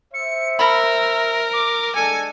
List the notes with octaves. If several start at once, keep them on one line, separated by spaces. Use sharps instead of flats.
C5 E5 C#7
A#4 B5 E6
D6
G#3 D4 A4 G#5 C#7